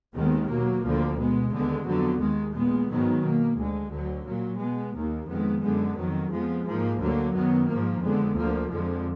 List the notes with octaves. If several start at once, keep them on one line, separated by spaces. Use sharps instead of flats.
D#2 D#3 G#3 B3
B2 F#3 A#3
D2 D3 F3 A#3
B2 G#3 B3
D#2 D3 G#3 B3
F2 D3 F#3 B3
D#2 D#3 G#3
A#2 G#3 B3
G#2 D#3 F#3 B3
B2 A#3
D2 D3 G#3
D2 D3 F#3
A#2 F#3 A#3
B2 G#3 B3
D#2 D#3 A#3
F2 D#3 G#3 B3
F#2 D3 G#3 B3
F2 D#3 F#3
F2 F3 G#3 B3
G#2 F3 A#3
D2 D3 F#3 A#3
F#2 D#3 F#3 B3
G#2 F3 A#3
F2 D3 G#3 B3
D2 D3 F3 A#3
F2 D3 F3 G#3